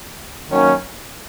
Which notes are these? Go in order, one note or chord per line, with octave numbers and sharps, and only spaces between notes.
D#3 F#3 A#3 C#4